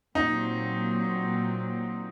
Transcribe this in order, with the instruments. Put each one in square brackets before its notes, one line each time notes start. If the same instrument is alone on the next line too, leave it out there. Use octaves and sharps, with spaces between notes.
[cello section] A#2 F#3 C4 [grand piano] D#4